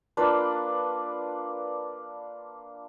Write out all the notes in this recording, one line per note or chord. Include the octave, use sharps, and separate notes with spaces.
A#3 D4 F4 B4